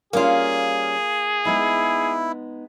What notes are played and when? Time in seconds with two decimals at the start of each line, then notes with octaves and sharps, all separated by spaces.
0.13 G3 A#3 C#4 F4 G#4
1.45 G#3 B3 D#4 E4